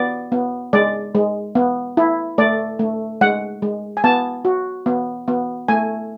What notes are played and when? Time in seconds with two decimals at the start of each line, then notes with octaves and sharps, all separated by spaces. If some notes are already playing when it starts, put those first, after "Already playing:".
Already playing: B3 D5
0.32 B3
0.73 G#3 D5
1.15 G#3
1.55 B3
1.97 E4
2.38 A3 D5
2.79 A3
3.21 G#3 F#5
3.62 G#3
3.97 G#5
4.04 B3 A5
4.45 F#4
4.86 B3
5.28 B3
5.68 A3 G#5